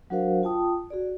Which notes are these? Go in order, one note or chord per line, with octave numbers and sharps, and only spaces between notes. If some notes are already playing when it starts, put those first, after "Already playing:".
F#3 D4 F#4 A#4 C5 F5
F4 G5 A5 D#6
F#4 G#4 D5